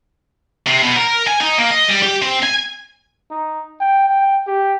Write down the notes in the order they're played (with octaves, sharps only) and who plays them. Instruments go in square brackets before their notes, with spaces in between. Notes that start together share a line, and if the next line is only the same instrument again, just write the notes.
[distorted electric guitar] C3
B2
A#4
G#5
D#4
A#3
D#5
G3
G4
C4
G#5
[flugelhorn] D#4
G5
G5
G4